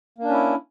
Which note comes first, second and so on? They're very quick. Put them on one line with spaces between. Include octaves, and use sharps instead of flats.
A#3 D4 C#4 E4